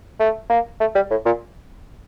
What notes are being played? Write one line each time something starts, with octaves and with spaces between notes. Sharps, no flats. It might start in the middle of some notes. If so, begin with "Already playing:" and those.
A3
A#3
A3
G3
A2
A#2